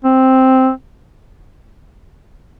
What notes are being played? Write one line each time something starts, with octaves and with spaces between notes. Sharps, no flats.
C4